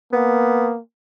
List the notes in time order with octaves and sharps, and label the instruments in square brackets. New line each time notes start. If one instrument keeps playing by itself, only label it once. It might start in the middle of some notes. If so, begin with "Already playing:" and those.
[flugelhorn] A#3 [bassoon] B3